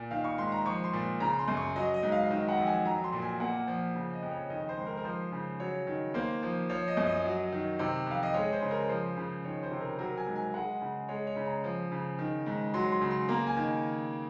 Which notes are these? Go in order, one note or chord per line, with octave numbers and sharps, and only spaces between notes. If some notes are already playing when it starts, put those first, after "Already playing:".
Already playing: A#2
D#3 F5
C#6
G#2 C6
A#5
F3 C#6
C6
A#2
C#3 A#5
C6
F#2
C#6
F#3 D#5
D#5
G#2
F5
D#3 D#5
F#5
F2
G#5
F#3 A#5
C6
A#2
G#5
A#3 F#5
F3
C#3
D#5
F2
C#5
D#3 D#5
C5
G#2
A#4
A#4
F3 C5
C#3
F#3 C#5
D#3
A#3 C5
F3
F3 C#5
D#5
F#2
D#5
F#3
D#3
C3
F2 F5
D#5
G#3 C#5
C5
C#3
A#4
F3 C5
C#3
D#3 C#5
C5
C3
A#4
F#3 A#4
G#5
G#2
G#5
G#3 F#5
C#3
G#3 C#5
C#5
C#3
A#5
F3
C#3
D#3
G#2
F#3 C6
C6
C#3
C6
A#3 A#5
G#5
D#3